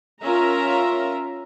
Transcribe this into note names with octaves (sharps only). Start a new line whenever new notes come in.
C#4 F4 A#4 E5 A#5